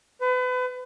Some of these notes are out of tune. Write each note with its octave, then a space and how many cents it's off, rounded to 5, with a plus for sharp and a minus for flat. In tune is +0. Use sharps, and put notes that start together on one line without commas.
B4 +35